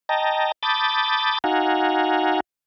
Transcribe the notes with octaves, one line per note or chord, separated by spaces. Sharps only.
D#5 G5 A5 A#5
A5 B5 D6 D#6 G6 A6
D#4 F#4 F5 F#5 G#5 A#5